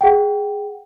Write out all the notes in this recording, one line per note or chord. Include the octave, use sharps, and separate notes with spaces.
G#4 F#5 G5